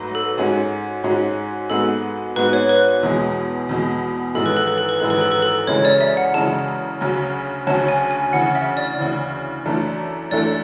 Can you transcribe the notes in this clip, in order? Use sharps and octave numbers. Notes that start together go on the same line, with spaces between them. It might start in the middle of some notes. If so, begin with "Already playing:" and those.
Already playing: G#2 F#3 A3 B4
A4
G#2 G#3 C#4 F#4
G#2 G#3 C#4 F#4
G#2 G#3 B3 F#4 A4
G#2 G#3 B3 F#4 B4
C#5
B4
E2 B2 G#3
E2 B2 G#3
G#1 F#2 E3 G#3 A4
B4
A4
B4
A4
B4
G#1 F#2 E3 G#3 A4
B4
A4
B4
A4
F#2 C#3 E3 G#3 C#5
D5
E5
F#5
F#2 C#3 E3 G#3 A5
D2 C#3 F#3 C#4
D2 C#3 F#3 C#4 A5
G#5
G#5
D2 C#3 E3 F#5
E5
D5
D2 C#3 E3
F#2 E3 A3 D4 A4
F#2 E3 A3 D4 A4 D5